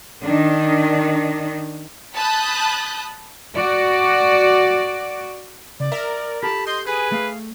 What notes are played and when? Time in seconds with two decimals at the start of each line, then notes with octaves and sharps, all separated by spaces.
0.22 D#3 D4
2.15 A5 B5 D#6 F#6 G6
3.56 F#4 D5
5.80 C#3 D5
5.92 A#4 E5
6.43 G4 A4 A5 B5
6.67 D#5 C6 G6
6.87 G#4 B4 G#5
7.12 A3 F5